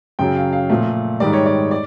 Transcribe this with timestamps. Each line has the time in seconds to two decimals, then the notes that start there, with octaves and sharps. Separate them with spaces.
0.19 F#2 C#3 F#3 G5
0.36 F5
0.53 F5
0.70 A#2 F3 A3
1.20 G#2 D#3 G3 D5
1.33 C#5
1.46 D5
1.71 D5